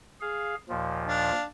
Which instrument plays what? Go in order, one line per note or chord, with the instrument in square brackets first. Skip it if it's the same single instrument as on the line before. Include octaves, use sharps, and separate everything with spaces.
[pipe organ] G#4 F5
D#2 A#2 F3
[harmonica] D4 F5